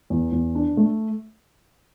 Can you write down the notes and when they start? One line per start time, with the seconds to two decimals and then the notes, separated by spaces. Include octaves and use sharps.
0.10 E2
0.32 E2
0.55 D4
0.77 A3